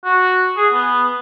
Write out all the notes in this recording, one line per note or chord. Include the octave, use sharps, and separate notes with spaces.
F#4
G#4
B3